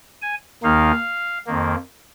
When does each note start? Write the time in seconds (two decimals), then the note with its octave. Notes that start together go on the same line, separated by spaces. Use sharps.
0.22 G#5
0.63 D#2 D#3 A#3 D#4 F5
1.46 F2 D#3 A#3